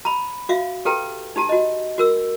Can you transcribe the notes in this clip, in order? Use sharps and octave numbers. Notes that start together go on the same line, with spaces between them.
A#5 B5
F#4 E5 F5
G4 A4 B4 G5 A#5
D#4 G4 A5 A#5
F#4 D#5
F#4 A#4 E6